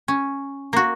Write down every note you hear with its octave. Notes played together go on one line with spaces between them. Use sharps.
C#4
A#3 F#4